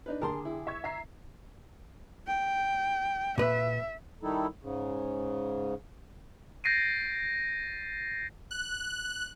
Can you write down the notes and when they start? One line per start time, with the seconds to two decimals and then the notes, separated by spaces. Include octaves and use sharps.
0.06 D4 D#4 B4
0.22 D3 G4 G#4 A#4 A5 C6
0.45 E4
0.67 E5 C#6 G#6
0.84 E5 A#5 C7
2.27 G5
3.38 A#2 B4 E5
4.23 D#3 G3 D#4 E4 A4
4.62 G#2 C#3
6.64 G6 A6 A#6 C7 D7 D#7
8.51 F#6